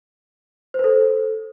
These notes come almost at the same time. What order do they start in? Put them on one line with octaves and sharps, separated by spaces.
C5 B4 A4